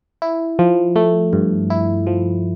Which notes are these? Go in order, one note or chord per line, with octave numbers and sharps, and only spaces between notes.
E4
F3
A3
G2
E4
F3